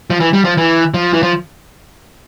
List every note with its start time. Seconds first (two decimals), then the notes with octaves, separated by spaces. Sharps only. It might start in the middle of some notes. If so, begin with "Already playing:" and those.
0.10 F3
0.20 E3
0.33 G3
0.45 F3
0.57 E3
0.94 F3
1.13 E3
1.23 F3